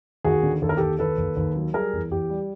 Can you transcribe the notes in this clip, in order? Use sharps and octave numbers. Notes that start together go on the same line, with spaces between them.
D#2 F#4 G#4
D3
D#2 A4
A#4
D#2 G4 A4
D#2 A4 B4
D#2
D#2
F#3
G3 G#4 A#4
E2
E2 G4
G3